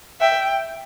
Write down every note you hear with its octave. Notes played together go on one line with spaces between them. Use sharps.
E5 G5